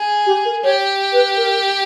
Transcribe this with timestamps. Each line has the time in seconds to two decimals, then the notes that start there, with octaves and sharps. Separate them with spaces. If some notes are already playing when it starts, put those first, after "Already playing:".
Already playing: G#4
0.26 G4
0.45 A#4
0.64 G4 C#5
1.12 B4
1.37 A#4